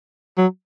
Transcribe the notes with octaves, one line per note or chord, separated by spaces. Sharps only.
F#3